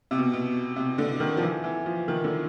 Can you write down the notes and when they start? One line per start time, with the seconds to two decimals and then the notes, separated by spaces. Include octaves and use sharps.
0.11 C3
0.18 B2
0.33 B2
0.76 C3
0.98 D3
1.20 D#3
1.37 F3
1.42 E3
1.64 E3
1.86 F3
2.08 D#3
2.24 D3